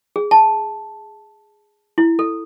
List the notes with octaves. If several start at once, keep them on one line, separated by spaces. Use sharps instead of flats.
G#4
A5
E4
A4